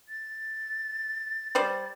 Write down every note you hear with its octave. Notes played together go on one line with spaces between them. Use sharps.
A6
G3 C5 D5